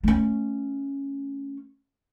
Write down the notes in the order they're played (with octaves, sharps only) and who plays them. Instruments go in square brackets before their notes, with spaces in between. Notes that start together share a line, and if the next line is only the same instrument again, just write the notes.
[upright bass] A3 C#4